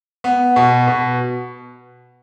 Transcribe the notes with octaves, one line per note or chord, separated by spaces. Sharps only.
B3
B2
B2